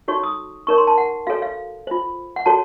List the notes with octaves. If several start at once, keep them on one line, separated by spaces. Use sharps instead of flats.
D#4 F#4 A4 C#5 C#6
D#6
D#4 A#4 C#5 C#6
C6
A5
F#5
F#4 A4 C#5 F5
F5
F4 C5
F#5
F#4 A4 C#5 A5